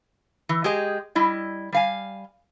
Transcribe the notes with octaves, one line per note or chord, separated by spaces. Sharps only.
E3
G#3 G4 G#4 D#5
G3 E4 D#5
G3 F5 G#5